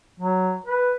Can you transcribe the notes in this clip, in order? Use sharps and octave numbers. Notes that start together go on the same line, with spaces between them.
F#3
B4